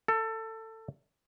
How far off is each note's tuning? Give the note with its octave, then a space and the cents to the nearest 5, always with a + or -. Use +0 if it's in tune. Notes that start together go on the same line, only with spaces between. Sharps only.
A4 +20